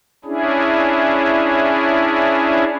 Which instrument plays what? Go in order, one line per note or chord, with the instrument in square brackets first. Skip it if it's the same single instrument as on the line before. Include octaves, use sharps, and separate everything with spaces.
[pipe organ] C#4 D4 E4 G#4